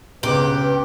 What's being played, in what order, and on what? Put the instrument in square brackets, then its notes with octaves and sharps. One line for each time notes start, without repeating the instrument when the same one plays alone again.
[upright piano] G1 C#2 D6 [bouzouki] G4 [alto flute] B4